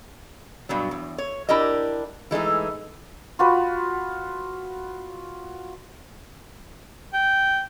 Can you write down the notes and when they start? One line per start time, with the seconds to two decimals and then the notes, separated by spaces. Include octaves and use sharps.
0.69 G2 B2 F#3
0.91 E2
1.18 C#5
1.49 D4 E4 G4 A#4 D#5
2.31 E3 G#3 A3 D#4
3.39 F4 F#4 B4
7.14 G5